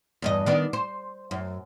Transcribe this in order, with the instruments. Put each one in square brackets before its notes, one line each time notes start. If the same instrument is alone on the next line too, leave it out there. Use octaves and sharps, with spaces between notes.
[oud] E2 G2 D#5
D#3 B3 D4
C5
F#2